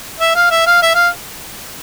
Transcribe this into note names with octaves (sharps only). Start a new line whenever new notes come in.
E5
F5
E5
F5
E5
F5